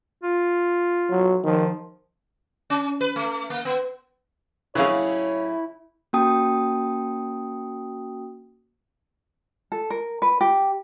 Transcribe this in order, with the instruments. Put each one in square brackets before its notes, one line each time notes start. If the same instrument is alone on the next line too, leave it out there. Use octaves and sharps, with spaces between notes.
[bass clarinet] F4
[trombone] F#3
[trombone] D#3 [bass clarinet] F3
[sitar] C#4
B4
A3
A#3
B3
[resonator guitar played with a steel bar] A2 F#3 F5 [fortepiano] C#3 C#4 G#4 [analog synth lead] E4 [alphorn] C#5
[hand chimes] A#3 C#4 F#4 G5 A5 D#6
[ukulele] A4
A#4
B4
G4